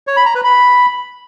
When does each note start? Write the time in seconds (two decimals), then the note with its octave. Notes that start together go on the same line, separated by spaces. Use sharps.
0.07 C#5
0.16 B5
0.26 A#5
0.35 B4
0.44 B5